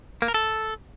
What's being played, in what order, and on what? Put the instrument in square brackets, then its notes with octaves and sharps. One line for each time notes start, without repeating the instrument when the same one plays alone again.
[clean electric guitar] A#3
A#4
A4